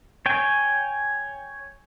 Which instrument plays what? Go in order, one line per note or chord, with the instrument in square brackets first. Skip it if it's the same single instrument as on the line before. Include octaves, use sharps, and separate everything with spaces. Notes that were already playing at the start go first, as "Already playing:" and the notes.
[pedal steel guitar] C#5 G5 G#5